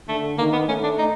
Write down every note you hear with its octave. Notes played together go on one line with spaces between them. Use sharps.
D3 A3
D#3 A#3
B3
A3 C#4
D4
D#4